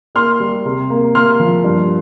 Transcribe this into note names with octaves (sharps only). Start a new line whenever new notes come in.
A#3 C6 F6
G3
C3
A#3
A#3 C6 F6
F3
G2